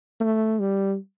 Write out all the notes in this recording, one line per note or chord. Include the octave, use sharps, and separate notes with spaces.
A3
G3